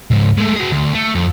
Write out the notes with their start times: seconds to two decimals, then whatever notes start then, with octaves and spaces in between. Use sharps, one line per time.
0.11 C#2 G#2
0.37 G#3 A3
0.55 F#4 G#4
0.72 D2
0.94 A3
1.15 F2